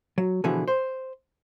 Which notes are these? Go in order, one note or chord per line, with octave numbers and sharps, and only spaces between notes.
F#3
B2 D3 E3 F3 G#4
C5